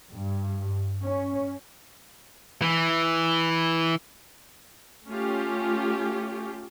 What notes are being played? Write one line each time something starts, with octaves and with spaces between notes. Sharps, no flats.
G2
C#4
E3
A3 C#4 F4 G4